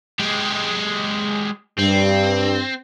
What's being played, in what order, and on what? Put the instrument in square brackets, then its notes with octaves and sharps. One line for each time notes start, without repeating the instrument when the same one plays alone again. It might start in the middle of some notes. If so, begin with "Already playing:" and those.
[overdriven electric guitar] G#3 G4
[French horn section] G2 [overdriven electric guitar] C4